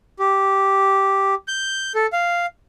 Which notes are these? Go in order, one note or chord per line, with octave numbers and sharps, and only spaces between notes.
G4
G6
A4
F5